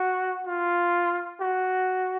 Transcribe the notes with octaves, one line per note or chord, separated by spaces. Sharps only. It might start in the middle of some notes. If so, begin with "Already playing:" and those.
Already playing: F#4
F4
F#4